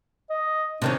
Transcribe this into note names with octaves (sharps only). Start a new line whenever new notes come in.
D#5
C3 D#3 C#4 D4